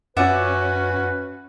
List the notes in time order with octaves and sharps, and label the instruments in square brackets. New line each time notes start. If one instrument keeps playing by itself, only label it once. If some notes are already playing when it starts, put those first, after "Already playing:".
[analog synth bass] F#2 [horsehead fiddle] C#4 F#4 [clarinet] B4 [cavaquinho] D5 E5 F#5